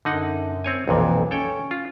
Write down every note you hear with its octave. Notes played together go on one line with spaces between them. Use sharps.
F#2 D3 D#4 F#5
C4 C#5 G#5
B1 F2 A#2 E3
C#4 A4 C#5 G5
F4